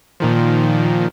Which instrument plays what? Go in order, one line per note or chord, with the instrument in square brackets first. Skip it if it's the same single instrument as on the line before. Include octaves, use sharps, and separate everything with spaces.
[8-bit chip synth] A#2 D#3 F3